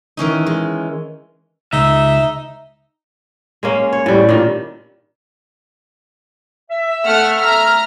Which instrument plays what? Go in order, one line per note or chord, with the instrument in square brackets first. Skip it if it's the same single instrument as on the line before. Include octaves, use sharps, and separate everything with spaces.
[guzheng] D#3 E3 C#4 D#4
G#3
[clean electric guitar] C#2 [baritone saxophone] D#4 [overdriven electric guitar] E5
[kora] G#3 A#3 C#4
C#5
A2 G3
A#2 D#3
[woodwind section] E5
[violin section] A3 F#5 F6
A#5 F6